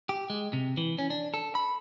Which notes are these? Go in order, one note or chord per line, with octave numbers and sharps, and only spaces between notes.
G4
G#3
C3
E3
C#4
D4
A4
B5